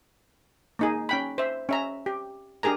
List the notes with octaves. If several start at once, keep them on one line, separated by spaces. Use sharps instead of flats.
A#3 D#4 G#4
C#4 G5 B5
C5 E5
C#4 E5 A#5
G4
D4 G4 G#4 A#4 A#5